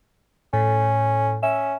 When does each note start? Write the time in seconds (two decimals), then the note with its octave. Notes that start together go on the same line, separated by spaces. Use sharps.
0.53 A2 C#4
1.43 C#4 E5